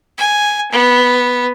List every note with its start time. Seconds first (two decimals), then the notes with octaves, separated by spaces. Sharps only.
0.18 G#5
0.72 B3